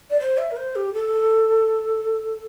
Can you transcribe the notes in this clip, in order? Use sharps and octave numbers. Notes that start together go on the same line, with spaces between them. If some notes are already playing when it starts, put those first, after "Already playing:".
D5
C5
E5
A#4
C5
G4
A4